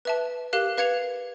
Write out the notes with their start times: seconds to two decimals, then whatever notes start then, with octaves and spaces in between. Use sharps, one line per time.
0.05 B4 E5 A5
0.53 G4 A#4 F5 F#6
0.78 B4 F5 G#6 C#7 F7